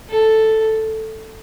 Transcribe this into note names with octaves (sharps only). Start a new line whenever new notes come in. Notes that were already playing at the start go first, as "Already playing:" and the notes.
A4